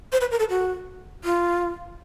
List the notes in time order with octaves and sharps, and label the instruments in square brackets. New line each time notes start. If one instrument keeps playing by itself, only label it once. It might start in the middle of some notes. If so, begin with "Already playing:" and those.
[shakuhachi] C5
B4
A#4
A4
F#4
F4